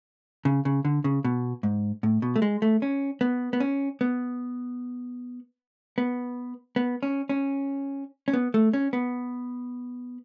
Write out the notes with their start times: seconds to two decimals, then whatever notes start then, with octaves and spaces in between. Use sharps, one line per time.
0.45 C#3
0.65 C#3
0.85 D3
1.04 C#3
1.24 B2
1.63 G#2
2.03 A2
2.22 B2
2.36 A3
2.42 G#3
2.62 A3
2.82 C#4
3.21 B3
3.53 B3
3.60 C#4
4.01 B3
5.98 B3
6.76 B3
7.03 C#4
7.29 C#4
8.28 C#4
8.33 B3
8.54 A3
8.73 C#4
8.93 B3